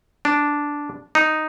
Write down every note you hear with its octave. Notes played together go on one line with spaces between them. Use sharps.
D4
D#4